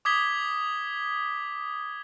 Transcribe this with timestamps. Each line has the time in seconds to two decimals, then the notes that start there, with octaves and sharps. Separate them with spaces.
0.05 D6 D#6 G#6 B6 G7